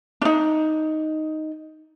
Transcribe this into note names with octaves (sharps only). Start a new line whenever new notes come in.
D4 D#4